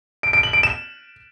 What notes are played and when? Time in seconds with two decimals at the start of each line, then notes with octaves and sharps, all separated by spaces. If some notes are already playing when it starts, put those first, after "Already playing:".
0.23 D7
0.33 D7
0.43 F#7
0.53 D7
0.63 E7